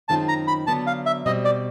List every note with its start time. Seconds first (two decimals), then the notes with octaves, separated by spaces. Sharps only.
0.09 F#2 D#3 G#3 C4 F4 A5
0.28 A#5
0.47 B5
0.67 D3 F#3 B3 A5
0.87 F5
1.06 E5
1.26 B2 G3 C4 D#5
1.45 D5